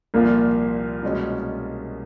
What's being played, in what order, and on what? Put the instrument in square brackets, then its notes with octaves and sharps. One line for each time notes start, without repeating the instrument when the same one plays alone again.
[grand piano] C2 A#2 F3 [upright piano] A#3
[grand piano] C2 B2 G#3 C#4